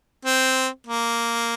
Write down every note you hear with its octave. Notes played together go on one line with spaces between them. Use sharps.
C4
A#3